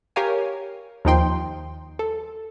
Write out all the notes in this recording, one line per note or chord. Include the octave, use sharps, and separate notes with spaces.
G4 A#4 C#5 F5 G#5
D#2 F3 D#4 G5 C6
A4